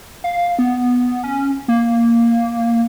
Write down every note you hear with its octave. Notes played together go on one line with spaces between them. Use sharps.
F5
B3
C#4
A#3